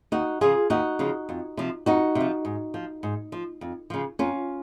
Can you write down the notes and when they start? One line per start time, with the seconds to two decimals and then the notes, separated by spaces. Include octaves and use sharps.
0.12 D#2 D#4 F#4
0.41 C#3 F3 F4 G#4
0.70 D#2 D#4 F#4
0.99 C#3 F3
1.29 F2
1.57 C3 F3
1.86 F2 D#4 F#4
2.15 C3
2.20 F3
2.45 G#2
2.74 F3
3.03 G#2
3.32 F3
3.61 F2
3.90 C#3 F3
4.19 F2 C#4 F4